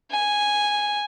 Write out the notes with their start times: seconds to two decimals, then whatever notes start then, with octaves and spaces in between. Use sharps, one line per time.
0.11 G#5